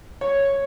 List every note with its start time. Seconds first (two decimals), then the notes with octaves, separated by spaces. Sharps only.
0.21 C#5